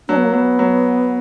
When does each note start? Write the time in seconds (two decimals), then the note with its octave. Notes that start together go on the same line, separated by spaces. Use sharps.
0.08 F#3 D4
0.16 B3
0.24 A#3
0.32 F#3 B3
0.59 F#3